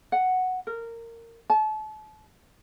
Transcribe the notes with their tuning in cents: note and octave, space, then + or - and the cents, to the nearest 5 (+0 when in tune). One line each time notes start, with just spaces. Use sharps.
F#5 +0
A#4 -20
A5 -35